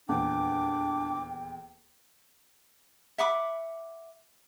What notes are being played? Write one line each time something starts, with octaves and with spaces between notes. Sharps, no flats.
D#1 E2 D4 G5 D6
E5 F#5 B5 D6